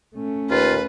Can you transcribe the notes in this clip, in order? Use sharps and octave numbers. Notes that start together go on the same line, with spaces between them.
A3 C#4
D#2 F4 B4